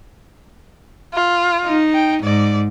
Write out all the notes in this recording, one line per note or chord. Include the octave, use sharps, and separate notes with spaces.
F4
D#4
G5
G#2 D5